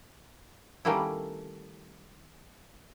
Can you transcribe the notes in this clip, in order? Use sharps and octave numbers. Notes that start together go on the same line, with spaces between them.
D#3 G3 A3 A#3 C#4 E4